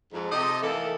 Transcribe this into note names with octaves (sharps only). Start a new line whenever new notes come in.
F2 G#2
C3 D#4 G4 A4 D#5
E3 A3 A#3 A4